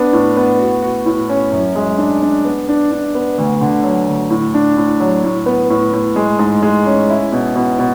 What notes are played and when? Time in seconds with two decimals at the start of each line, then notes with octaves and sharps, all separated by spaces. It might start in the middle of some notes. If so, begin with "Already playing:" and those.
Already playing: B3 D4
0.13 A2
0.37 B3
0.59 F#4
0.82 F#4
1.06 A2
1.29 C#4
1.52 F#2
1.75 G#3
1.98 D4
2.22 D4
2.45 B3
2.69 D4
2.92 D4
3.15 B3
3.38 D2
3.61 D3
3.84 F#3
4.08 D2
4.30 A2
4.54 D4
4.77 A2
5.00 F#3
5.24 A2
5.46 B3
5.70 A2
5.93 A2
6.16 G#3
6.39 G#2
6.62 G#3
6.86 C#4
7.10 E4
7.32 B2
7.56 B2
7.79 B2